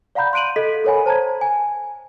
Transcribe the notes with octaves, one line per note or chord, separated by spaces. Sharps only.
D5 F5 F#5 A#5 B5 G6
C6 F#6 D7 D#7 F#7
A4 D#5 B6
A4 A#4 C#5 F#5 G#5 B5
C5 A5 A#5 G#6
G#5